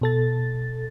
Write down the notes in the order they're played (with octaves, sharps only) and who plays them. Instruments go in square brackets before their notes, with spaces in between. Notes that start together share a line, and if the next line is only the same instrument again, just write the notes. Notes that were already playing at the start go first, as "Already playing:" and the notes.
[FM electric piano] B2 A4 A6